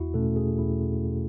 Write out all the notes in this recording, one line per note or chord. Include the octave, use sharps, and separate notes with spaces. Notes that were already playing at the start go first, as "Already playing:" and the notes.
Already playing: E2 E4 F#4
B2 A3 C#4 A4
G#4
E2 E4